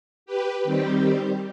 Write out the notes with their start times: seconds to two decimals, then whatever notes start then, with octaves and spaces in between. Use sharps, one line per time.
0.26 G4 B4
0.64 D#3 G3 C4 G4